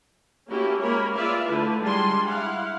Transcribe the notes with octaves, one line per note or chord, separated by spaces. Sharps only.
A3 A#3 C#4 E4 F#4 G4
G#3 A#3 A#4 C#5 B5
F4 G#4 B4 D5 E5 F5
D3 A3 E4 B4
G3 G#3 D4 F4 G#5 C6
E4 F5 F#5